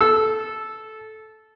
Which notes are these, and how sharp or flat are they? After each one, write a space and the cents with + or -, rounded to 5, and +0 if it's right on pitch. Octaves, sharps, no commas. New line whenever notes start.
A4 -15 E6 +0